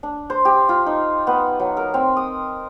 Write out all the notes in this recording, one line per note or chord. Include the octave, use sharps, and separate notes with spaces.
D4
C5
G4
F4
D#4
B3
F#3
A#4
C4
D#6